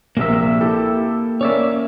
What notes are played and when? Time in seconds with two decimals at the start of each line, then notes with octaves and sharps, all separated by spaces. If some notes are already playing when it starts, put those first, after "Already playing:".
0.17 A#1 C3 A#3 A#4 E5
0.61 E4 G4 A4
1.41 A#3 C#4 C#5 D5 E5